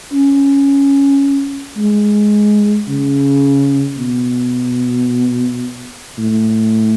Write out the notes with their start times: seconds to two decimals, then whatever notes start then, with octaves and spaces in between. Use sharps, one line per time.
0.13 C#4
1.77 G#3
2.88 C#3
3.98 B2
6.18 A2